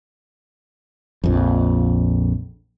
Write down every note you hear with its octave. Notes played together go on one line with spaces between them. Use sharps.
A#1 F2